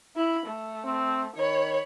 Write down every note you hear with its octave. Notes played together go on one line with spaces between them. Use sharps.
E4 B5
A3
C4
D#3 C#5 B5